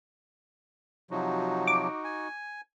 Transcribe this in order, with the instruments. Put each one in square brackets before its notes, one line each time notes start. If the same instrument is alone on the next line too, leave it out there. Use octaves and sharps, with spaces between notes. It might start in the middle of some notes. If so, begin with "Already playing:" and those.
[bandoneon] C3 F3 F#3 [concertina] D#4 F#4
[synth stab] D6
[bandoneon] G#5